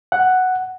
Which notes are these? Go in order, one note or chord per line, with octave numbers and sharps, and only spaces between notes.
F#5